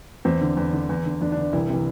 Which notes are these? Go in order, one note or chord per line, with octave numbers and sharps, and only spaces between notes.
E2 C4
D3
E2
D3
E2
D3
E2 D4
D4
D3
D4
C2 E3 E4
C3 E3